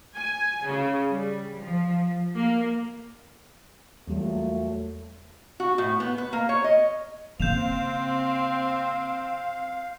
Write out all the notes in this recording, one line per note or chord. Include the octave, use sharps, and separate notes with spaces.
G#5
C#3
G3
F3
A#3
E2 A#2 F#3 G3 A3
F#4
A2
B3
B4
A#3
C#5
D#5
C#3 A#3 C4 F5 G6 E7 F7